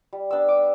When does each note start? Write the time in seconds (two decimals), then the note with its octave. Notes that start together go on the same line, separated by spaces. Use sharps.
0.13 G3
0.31 B3 D4 E6
0.48 G3 D6